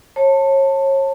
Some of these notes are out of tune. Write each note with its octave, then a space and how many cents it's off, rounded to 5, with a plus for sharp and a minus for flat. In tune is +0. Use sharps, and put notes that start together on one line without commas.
C#5 -30 A5 +15